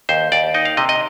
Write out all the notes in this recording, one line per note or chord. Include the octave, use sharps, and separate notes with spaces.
D#2 C5
D#2 D5
D#4 D#5
F5
C3 D#5
D#5